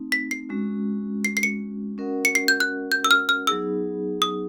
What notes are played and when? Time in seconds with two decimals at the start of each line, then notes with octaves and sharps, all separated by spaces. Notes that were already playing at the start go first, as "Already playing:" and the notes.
Already playing: A3 C4 D#4
0.12 B6
0.31 C7
0.49 G#3 C#4 F#4
1.25 C7
1.37 C7
1.43 C#7
1.98 C#4 F#4 A#4 D#5 F#5
2.25 C#7
2.35 C7
2.48 G6
2.60 F#6
2.92 G6
3.04 E6
3.11 F6
3.29 F6
3.47 F#3 B3 D#4 G#4 E6
4.22 D#6